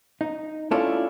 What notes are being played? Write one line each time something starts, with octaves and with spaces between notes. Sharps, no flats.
D#4
A3 C#4 D4 E4 F4 A4